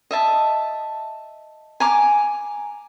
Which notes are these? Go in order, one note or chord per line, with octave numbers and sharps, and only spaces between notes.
D#5 E5 A5
G#5 A#5 D6